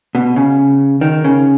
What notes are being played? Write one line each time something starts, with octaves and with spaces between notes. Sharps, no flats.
B2
C#3
D#3
C#3